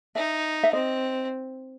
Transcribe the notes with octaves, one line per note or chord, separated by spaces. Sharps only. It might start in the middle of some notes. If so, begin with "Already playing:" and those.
D#4 E5
E5
C4 D#5